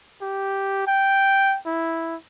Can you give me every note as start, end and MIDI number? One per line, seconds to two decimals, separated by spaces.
0.22 0.85 67
0.87 1.57 79
1.66 2.16 64